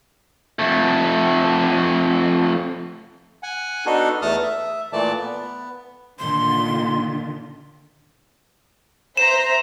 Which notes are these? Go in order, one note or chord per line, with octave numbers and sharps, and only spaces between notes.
F2 A3
F#5 G#5
B3 D4 D#4 F#4 A4
E2 A3 A5 D#6 F6
E5
A#2 E3 A3 D5 A5
B3
A#2 D3 D#3 C6
C5 E5 A#5 E7